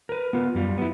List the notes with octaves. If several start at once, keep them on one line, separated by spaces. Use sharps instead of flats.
A#4 B4
B3 F4
F#2 G3 F4
B3 E4